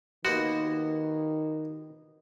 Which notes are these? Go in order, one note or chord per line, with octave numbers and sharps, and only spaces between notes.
D#2 D#3 B3 F#4 C5